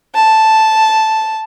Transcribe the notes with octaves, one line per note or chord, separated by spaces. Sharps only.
A5